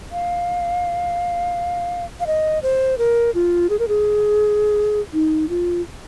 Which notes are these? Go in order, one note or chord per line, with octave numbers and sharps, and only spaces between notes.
F5
F5
D#5
C5
A#4
F4
G#4
A#4
G#4
D#4
F4